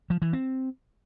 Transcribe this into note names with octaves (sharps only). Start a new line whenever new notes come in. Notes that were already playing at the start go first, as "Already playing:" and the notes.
F3
E3
C4